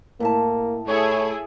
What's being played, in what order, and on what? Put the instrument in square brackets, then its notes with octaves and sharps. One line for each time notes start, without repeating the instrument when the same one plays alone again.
[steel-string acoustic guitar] A2 E5 A5 [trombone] A#3
[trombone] A3 [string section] E4 G#4 A4 [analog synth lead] C#5